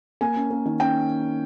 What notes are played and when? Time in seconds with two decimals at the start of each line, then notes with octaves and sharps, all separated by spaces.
0.21 A#3 G#5
0.36 C#4
0.50 A#3
0.65 D#3
0.80 C#4 G5